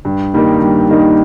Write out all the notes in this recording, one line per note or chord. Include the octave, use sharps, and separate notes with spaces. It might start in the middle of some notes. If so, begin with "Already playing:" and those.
G2
D#3 G3 A#3 D#4
G2
D#3 G3 A#3 D#4